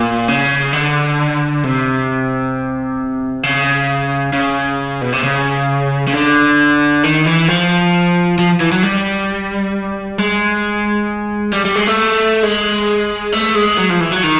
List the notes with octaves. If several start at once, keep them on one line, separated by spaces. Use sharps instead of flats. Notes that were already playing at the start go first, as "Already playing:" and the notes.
Already playing: A#2
C#3
D3
C3
C#3
C#3
B2
C3
C#3
C#3
D3
D#3
E3
F3
F3
E3
F#3
G3
G#3
G3
G3
G#3
A3
G#3
A3
G#3
F#3
F3
E3
F#3
D#3